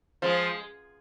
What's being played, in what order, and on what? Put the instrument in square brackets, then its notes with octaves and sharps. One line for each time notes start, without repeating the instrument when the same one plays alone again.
[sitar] F3 G#3